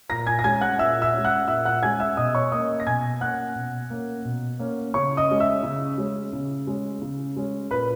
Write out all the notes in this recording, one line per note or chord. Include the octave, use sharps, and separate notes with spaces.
A#2 A#5 A#6
G#5 G#6
A#6
G#3 C#4 G#5 G#6
F#5 F#6
A#2 E5 E6
E5 E6
G#3 C#4
F#5 F#6
A#2 E5 E6
F#5 F#6
G#3 C#4 G#5 G#6
E5 E6
B2 D#5 D#6
C#5 C#6
A#3 C#4 D#5 D#6
A#6
B2 G#5 G#6
A#3 C#4 F#5 F#6
B2
A#3 C#4
B2
A#3 C#4
C#3 C#5 C#6
D#5 D#6
G#3 C#4
E5 E6
C#3
G#3 C#4
C#3
G#3 C#4
C#3
G#3 C#4
A#2 B4 B5